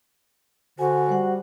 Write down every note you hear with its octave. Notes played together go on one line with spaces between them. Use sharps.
D3 F#4 C5 G#5
G3 C5 F#5